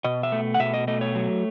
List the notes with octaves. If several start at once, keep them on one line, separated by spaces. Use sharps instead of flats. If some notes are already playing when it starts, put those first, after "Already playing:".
B2 D#5
E5
A3
F#5
B2 E5
D#5
A3 D#5
C#5
F#3